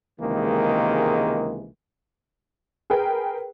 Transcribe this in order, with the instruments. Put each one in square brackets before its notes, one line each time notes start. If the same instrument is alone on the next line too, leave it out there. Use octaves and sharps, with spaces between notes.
[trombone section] C#2 C3 D#3 E3 G#3 A#3
[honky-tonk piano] G#4 A#4 B4 G5